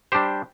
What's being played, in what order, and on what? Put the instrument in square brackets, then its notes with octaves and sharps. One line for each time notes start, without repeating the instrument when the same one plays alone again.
[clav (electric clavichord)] G3 D4 G4 C5